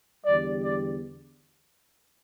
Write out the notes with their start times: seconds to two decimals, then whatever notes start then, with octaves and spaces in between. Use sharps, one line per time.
0.25 E2 D3 G3 D5
0.64 D5